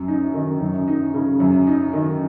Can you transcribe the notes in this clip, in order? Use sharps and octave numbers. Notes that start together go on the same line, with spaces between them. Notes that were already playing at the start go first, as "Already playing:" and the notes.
Already playing: F#2
D#4
D#3
F#2
D#4
C#3
F#2
D#4
D#3